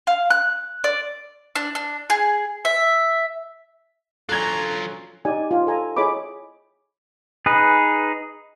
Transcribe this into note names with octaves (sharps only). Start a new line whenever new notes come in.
F5
F#6
D5
D4
D4
G#4
E5
F#3 C#4 D4 F4 A4 A#5 F#6 G#6
D#4 G4 D5 G#5
F4
A4 G#5 A#5
E4 G#4 C#5 D#5 B5 D6
D#4 G#4 B4